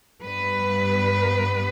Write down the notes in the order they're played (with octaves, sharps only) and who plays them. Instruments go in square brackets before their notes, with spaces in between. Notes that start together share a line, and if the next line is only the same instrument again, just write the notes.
[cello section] G2 G3 B3 B4